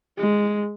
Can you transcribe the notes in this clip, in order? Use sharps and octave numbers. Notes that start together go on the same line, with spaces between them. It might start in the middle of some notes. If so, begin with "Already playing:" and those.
G#3